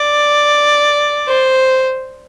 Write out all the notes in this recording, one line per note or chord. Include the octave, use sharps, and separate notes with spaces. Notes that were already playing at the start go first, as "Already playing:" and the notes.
Already playing: D5
C5